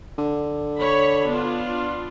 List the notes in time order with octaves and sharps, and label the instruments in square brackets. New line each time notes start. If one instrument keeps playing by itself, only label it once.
[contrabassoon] D3
[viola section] A4 C#5 B5
B3 D4 F4